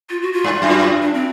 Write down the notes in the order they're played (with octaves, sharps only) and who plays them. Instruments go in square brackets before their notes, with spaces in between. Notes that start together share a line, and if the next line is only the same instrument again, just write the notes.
[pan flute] F4
F#4
F4
[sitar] G2
F#2
[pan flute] F#4
F4
D4
C4